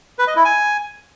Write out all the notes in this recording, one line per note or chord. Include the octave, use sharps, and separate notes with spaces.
B4
D#5
E4
G#5